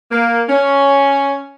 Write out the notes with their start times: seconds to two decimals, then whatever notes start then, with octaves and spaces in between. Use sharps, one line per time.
0.11 A#3
0.49 C#4